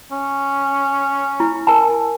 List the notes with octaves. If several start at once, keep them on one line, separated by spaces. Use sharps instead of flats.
C#4
E4
A#4 G#5 A5